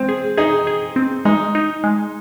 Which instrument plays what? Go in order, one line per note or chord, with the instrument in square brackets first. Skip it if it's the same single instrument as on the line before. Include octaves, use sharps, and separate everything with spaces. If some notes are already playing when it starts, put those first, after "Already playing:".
Already playing: [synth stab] G#3 [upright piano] C4
[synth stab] G#4
[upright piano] D#4 [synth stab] G#4
[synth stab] G#4
C4
[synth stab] G#3 [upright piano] D#4
[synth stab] D#4
G#3